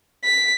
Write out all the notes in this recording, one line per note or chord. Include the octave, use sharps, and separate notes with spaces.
B6